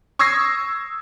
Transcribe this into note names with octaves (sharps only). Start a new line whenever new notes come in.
C#6 D#6 E6 G#6 A#6 C7